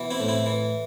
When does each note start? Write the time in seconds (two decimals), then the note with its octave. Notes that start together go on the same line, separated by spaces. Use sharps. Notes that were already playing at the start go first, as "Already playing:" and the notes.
Already playing: B2 E3
0.11 C4 E4
0.20 A2
0.28 C4 E4
0.46 E3